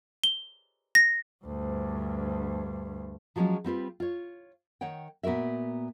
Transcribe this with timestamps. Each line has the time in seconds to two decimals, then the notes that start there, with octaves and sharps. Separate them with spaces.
0.24 G7
0.95 A#6
1.45 D2 G2
3.36 F3 F#3 G#3 C4 C#4 F4
3.64 G3 C4 F4 B4
4.00 F4 C#5
4.81 D#3 C#5 F#5 G5
5.23 A#2 B3 F#4 A#4 E5